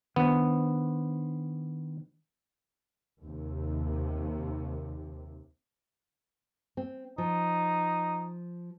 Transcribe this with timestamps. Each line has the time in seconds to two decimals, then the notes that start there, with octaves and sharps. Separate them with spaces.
0.16 D#3 B3 D4 C5
3.22 D#2 C3
6.77 C4
7.18 F3 D#4